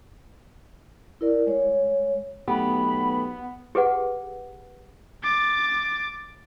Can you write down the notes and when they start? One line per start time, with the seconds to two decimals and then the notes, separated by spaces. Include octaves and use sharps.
1.21 E4 A#4 D5
1.47 G#3 C#5
2.48 B1 A3 B3 G4 B5
3.75 G4 G#4 B4 F#5
5.24 D6 A6